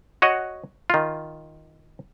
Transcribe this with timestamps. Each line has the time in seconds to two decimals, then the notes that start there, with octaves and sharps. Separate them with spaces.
0.22 F#4 C#5 D#5 F#5
0.90 D#3 F4